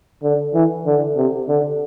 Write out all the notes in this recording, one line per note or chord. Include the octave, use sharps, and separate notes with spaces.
D3
E3
D3
C3
D3